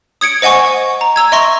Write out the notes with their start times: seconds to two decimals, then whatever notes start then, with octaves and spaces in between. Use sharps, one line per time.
0.21 D#6 G#6 C#7 D7
0.42 C5 D#5 F#5 G#5 C#6
1.01 A#5
1.16 A#5 E6 G#6
1.32 D#5 E5 C6 C#6 A#6